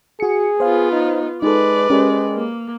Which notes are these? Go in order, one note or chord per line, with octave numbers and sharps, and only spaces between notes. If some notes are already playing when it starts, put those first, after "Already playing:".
F#4 G#4 C#7
B3 F4 C5 F5
D#4
G#3 D#4 A4 B4 D5
G#3 C#4 G4 A#4
A#3